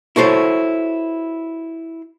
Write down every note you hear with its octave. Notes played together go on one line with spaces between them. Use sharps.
E4 F#4 A4 C5 C#5